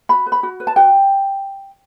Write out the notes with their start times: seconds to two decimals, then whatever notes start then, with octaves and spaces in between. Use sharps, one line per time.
0.09 F#4 B5
0.26 B4
0.32 B5
0.43 F#4
0.60 B4
0.67 A5
0.76 F#4 G5